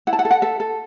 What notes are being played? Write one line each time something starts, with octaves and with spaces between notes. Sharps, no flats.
E4 F#5
A5
F#5
A4
F#5
A4 E5
A4